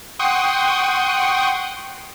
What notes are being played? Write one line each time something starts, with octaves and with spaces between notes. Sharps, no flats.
F#5 G5 C6 C#6 D#6